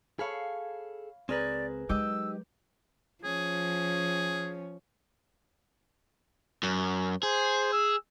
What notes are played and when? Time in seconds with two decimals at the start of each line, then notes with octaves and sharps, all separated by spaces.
0.19 G#4 A4 C#5 F5 B5
1.29 C#2 C4 G#4 A#4 B4 D5
1.89 F#3 G#3 D#4 G4 D#5 D6 E6 G6
3.24 F3 C#4 G#4
6.63 F#2
7.23 G#4 C5
7.73 E6